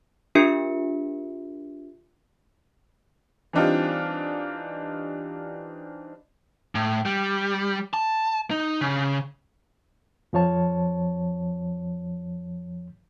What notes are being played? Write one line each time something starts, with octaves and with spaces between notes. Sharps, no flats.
D4 F4 G4 A#4 E5 C#7
E3 G3 C4 D4 D#4 F4
A2
G3
A5
D#4
C#3
F2 F3 C#5 A5